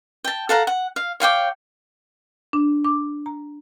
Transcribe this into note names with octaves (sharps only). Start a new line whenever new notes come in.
G5 A5
A4 F5 F#5 A#5
F#5
F5
C#5 F5 G5 D6
D4
D6
A#5